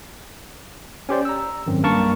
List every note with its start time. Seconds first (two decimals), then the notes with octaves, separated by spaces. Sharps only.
1.09 C#4 G4 C5 D5
1.25 A#5 E6
1.66 G#1 F#2 C4
1.83 B1 G2 A#3 A#4 A5 C#6